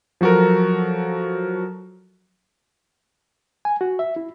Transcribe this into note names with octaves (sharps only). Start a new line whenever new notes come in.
F3 F#3 F#4 A4 A#4
G#5
F#4
E5
E4